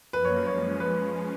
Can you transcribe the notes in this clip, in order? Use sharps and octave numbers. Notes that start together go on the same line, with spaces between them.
F#2 F3 A#3 B4
C#5
F3 G#3 C#4 C#5
F3 G#3 C#4 B4